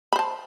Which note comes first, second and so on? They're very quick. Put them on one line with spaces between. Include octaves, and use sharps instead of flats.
B5 C5 A5